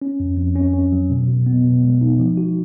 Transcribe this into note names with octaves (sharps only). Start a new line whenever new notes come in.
C#4
F2
F2
C#4
C#4
F#3
B2
B2
B3
B2
G#3
D#4
F3
F#4